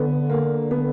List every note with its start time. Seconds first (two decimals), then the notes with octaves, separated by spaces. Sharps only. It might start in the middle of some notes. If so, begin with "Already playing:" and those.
Already playing: D3 B3
0.30 A#3
0.71 B3